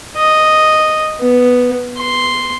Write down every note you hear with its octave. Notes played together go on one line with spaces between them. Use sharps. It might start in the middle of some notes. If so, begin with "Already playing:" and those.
D#5
B3
C6